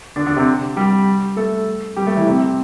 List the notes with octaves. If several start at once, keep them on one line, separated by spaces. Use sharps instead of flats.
D3 D4
D3 D4
C3 C4
G3 G4
A3 A4
G3 G4
A3 A4
E3 E4
C3 C4